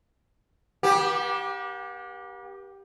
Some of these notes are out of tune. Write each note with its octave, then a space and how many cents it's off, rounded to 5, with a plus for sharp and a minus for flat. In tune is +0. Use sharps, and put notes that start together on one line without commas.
B3 -45 G4 +0